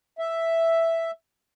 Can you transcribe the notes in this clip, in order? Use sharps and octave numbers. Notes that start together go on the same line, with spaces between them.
E5